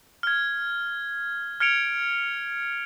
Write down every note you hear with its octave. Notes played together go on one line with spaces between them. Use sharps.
F6 G#6
F6 G#6 C#7 D7 F7